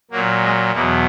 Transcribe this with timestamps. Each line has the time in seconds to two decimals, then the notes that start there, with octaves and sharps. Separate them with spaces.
0.11 A#2 F#3 A#3
0.42 G#3
0.72 E2 B2 F#3 A#3